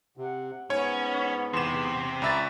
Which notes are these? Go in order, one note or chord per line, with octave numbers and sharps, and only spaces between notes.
C3 F#5
G#2 B3 C#4 C#5
E2 C4 G4 E7
C#2 D5 E5 A#5 B5 A6